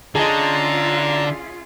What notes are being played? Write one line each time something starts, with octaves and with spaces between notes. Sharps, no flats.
D3 C#4 F4 G#4 D#5 A5 A#5